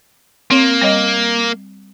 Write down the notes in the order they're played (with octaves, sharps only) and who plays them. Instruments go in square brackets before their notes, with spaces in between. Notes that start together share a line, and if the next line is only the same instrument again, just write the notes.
[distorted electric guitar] A#3 [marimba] C4 C#5
[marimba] G3 C#5 D#5